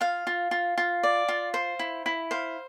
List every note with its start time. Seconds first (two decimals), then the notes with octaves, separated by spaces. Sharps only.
0.01 F4 F5
0.27 F4
0.51 F4
0.78 F4
1.03 D5
1.28 F4
1.54 C5
1.79 E4
2.06 E4
2.31 C5 F5